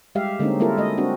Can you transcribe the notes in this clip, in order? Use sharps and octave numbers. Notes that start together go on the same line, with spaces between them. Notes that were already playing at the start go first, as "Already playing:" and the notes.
G3 G#3 G4 E5 F5
D3 G#3 A#3 C4 C#4 D#4
G3 A#3 E4 F4 A4 A#4
G#3 D#5
C4 D4 F#4